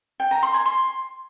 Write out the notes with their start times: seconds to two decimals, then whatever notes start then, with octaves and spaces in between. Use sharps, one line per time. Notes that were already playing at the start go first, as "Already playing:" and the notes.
0.20 G5
0.31 A#5
0.43 C6
0.54 G#5
0.66 C6